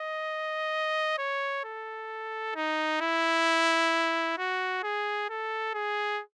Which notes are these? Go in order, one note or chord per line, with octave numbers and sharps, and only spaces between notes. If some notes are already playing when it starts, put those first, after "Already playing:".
Already playing: D#5
C#5
A4
D#4
E4
F#4
G#4
A4
G#4